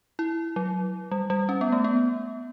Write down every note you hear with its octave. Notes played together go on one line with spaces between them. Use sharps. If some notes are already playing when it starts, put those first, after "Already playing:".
E4
F#3
G3
G3
C#4
B3
A3
B3